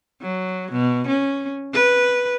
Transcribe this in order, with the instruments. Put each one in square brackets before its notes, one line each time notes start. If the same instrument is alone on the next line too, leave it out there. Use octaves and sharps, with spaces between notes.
[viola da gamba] F#3
B2
C#4
B4